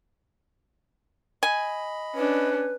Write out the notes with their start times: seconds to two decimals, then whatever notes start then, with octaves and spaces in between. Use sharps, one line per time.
1.43 D#5 G#5 B5
2.15 C#4 D4 B4